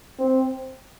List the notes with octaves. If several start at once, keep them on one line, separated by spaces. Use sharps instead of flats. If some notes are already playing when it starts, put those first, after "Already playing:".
C4